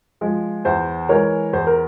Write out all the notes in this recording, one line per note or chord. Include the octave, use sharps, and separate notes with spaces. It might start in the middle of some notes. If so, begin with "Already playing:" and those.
F3 G#3
E2 C5 E5
E3 G#3 A#4 C#5
E2 C5
A#4